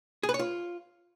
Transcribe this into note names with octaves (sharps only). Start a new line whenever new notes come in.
G#4
B4
C#5
F4